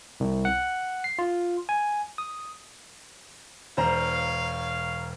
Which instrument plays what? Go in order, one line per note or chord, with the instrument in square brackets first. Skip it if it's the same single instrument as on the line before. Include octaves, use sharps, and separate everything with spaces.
[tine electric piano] C2
F#5
C7
F4
G#5
D#6
[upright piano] E1 C5 A#5 [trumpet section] C#5 F5